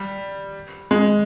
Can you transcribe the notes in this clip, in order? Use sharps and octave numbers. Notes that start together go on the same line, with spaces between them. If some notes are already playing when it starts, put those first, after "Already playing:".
Already playing: G3
G#3